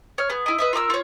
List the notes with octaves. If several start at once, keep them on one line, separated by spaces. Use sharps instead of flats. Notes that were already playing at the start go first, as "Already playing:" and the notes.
C#5 F6
B3 G#4
E4 D#5
B4 D#5 E5
F4 A#4 D6 E6
F4 C#5